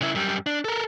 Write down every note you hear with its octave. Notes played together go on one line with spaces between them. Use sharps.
C#3 E4
F#2 G3
D4
A4 A#4